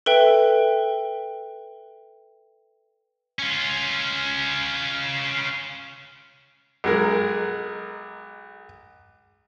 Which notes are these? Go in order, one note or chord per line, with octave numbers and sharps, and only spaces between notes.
A4 B4 E5 G5
C#4 F4
B1 G#3 A#4